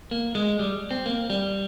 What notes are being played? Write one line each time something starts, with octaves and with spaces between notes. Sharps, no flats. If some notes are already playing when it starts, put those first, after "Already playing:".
A#3
G#3
G3
C4
A#3
G3